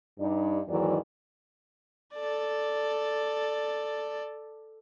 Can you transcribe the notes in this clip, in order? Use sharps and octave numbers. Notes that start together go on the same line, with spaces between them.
G2 D#4 D5
E2 G#2 D#3 E3 F#3 D5
A4 D5